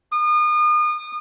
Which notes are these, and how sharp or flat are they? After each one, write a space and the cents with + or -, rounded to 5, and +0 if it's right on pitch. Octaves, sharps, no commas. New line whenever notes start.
D#6 -35